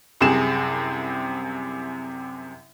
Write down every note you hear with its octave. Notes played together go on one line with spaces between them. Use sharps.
C2 F#2 C3 C4 G#4 E7